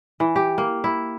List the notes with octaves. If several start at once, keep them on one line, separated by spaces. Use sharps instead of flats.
E3
G4
A#3
E4